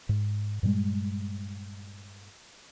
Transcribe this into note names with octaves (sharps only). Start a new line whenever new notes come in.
G#2
G2 A#2 G3 G#3